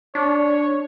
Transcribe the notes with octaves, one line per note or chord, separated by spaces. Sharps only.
D4 C#5